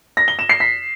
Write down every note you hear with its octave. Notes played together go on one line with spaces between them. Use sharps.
A#6
G7
E7
C7
B6